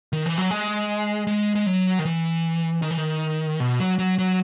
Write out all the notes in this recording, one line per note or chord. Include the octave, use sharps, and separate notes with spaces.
D#3
E3
F#3
G#3
G#3
G#3
F#3
D#3
E3
D#3
E3
D#3
B2
F#3
F#3
F#3